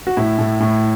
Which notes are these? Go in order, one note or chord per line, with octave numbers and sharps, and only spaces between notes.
F#4
A2 E4
A2
A2